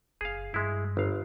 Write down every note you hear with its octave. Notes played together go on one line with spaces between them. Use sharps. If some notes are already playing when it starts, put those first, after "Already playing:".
F#1 G#4 F5
G2 G#3 E4
G1 F5